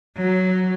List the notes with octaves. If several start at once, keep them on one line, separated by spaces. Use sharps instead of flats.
F#3